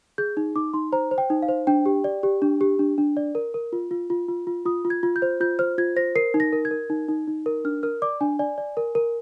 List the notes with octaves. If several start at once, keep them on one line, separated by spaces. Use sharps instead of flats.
G#4 G6
D#4
D#4 D6
D#4 C6
C5 A#5
C5
G5
D#4
F5
C5
D4 G5
G4
D5
G4
D4
G4
D4
D4
D5
A#4
A#4
F4
F4
F4
F4
F4
F4 D#6
F4
G#6
F4
G6
C5
F4 G6
C5 F6
F4 G#6
C5 A#6
A#4 C7
D#4
A#6
A#4
G#6
A#4
D#4
D#4
D#4
A#4
D4 F6
A#4 F6
D5 D6
D4 G#5
D5 G#5
D5
A#4
A#4